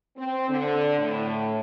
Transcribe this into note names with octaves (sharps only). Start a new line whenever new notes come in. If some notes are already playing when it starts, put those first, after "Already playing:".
C4
D3
A2